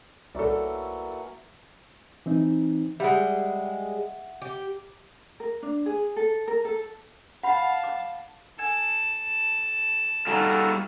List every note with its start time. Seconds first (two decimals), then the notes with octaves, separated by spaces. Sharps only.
0.35 C2 E3 F#3 A#3 A4 D5
2.26 E3 C4 D#4
3.00 G3 G#3 E5 F#5
4.42 G4
5.40 A#4
5.63 D4
5.86 G#4
6.16 A4
6.48 A#4
6.65 A4
7.43 F5 F#5 A5 B5
7.84 D6
8.58 A4 G#5 A5
10.27 G3 D#4 F4 F#4 G#4 A4 F5 A#5